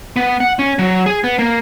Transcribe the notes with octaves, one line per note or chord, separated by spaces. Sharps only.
B3
F#5
C#4
F#3
G#4
B3
A#3